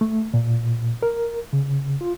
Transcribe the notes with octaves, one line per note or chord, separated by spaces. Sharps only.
A3
A#2
A#4
C#3
F4